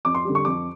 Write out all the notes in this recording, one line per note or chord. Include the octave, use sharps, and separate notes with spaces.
F2 D6
C6
D3 G3
C#6
F2 D6